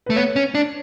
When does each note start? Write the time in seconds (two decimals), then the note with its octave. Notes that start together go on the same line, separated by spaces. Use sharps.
0.06 A3 B4
0.16 B3 C#5
0.36 C#4
0.55 D4